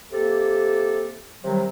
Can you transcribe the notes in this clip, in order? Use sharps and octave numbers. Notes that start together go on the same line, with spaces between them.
C3 A#3 G4 A4
C3 D#3 F#3 G3